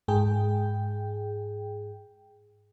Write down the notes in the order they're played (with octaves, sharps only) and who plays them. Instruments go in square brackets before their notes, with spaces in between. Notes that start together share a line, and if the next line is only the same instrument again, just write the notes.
[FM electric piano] G#2 G#4 G5